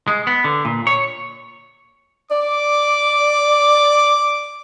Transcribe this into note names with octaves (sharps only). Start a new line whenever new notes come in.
G#3
B3
D3
A#2
C#5
D5 D6